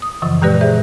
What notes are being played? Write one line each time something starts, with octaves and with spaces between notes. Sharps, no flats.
D#6
F#2 C#3 E3 F3
A#2 G#3 G4 B4 D5
G#4 C5 E5